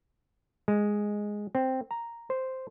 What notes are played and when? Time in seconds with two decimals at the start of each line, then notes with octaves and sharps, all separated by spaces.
0.68 G#3
1.55 C4
1.91 A#5
2.30 C5